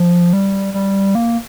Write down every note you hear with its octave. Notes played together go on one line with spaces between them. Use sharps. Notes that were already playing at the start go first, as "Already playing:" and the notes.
Already playing: F3
G3
G3
A#3